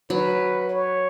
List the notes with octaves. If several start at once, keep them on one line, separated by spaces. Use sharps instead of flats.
F#3 B4
C#5